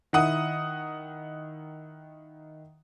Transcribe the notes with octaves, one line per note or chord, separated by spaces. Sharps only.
D#3 E4 F#5 D#6